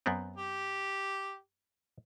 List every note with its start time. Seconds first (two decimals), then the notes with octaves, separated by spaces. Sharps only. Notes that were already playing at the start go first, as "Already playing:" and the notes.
0.06 F#2 B3 C4
0.36 G4